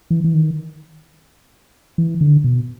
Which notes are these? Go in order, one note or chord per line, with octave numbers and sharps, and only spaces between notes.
E3
E3
D#3
E3
D3
B2